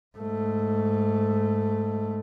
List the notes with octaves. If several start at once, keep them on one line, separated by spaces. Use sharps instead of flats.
G#2 A3